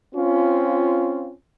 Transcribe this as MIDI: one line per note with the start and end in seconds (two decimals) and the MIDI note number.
0.15 1.31 60
0.15 1.31 61
0.15 1.31 65